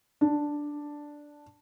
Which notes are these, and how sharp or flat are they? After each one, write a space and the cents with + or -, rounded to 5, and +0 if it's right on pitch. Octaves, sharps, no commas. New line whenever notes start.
D4 +0